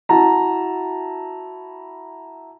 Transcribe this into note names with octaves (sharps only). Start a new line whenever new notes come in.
E4 F#4 A5 A#5